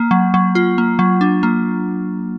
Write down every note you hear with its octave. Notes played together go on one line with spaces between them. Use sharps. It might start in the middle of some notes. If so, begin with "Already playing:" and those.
Already playing: A#3
F#3
F#3
F4
A#3
F#3
D4
A#3